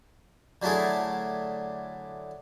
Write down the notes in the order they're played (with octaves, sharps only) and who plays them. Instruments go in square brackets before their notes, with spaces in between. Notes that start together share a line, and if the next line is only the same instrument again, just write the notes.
[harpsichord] D3 F#3 A3 E4 G#4